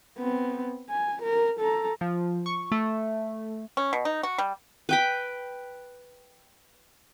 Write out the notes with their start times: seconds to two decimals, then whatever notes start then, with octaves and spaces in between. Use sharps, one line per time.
0.18 B3 C4
0.90 G#5
1.23 A#4
1.60 A4 A#5
2.01 F3
2.46 C#6
2.72 A3
3.77 C#4
3.93 B2
4.05 D#4
4.23 F#4
4.38 G3
4.89 B4 G5 B5